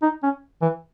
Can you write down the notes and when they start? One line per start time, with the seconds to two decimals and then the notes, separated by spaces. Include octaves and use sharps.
0.02 D#4
0.23 C#4
0.62 E3